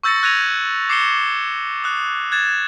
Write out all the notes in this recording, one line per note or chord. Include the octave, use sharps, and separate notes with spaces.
C#6 E6 G6 A6 A#6 C#7
E6 F#6 G#6 A#6 D#7 F7
D6 C7 C#7 E7 G7
D#6 F#6
F#6 G#6 A6 E7